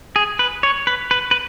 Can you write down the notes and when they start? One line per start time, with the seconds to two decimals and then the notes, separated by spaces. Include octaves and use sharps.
0.16 G#4
0.39 B4
0.63 C#5
0.87 B4
1.11 B4
1.31 B4